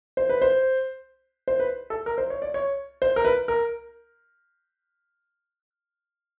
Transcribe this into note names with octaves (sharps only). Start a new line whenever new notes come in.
C5
B4
C5
C5
B4
A4
A#4
C5
C#5
D5
C#5
C5
A#4
B4
A#4